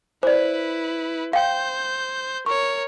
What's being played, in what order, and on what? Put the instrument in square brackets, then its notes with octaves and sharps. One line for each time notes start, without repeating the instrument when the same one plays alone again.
[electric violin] E4 B4 [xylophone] C5 D5
[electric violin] C5 G6 [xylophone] F5 G5
[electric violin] A#4 C#5 [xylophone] C#6